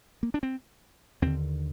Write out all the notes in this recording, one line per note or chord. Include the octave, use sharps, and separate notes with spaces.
A#3
D4
C4
D#2 D3 C4